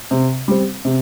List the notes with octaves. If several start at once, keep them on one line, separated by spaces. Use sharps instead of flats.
C3
G3 C4
C3